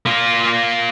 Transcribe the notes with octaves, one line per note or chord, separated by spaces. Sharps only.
A#3 F4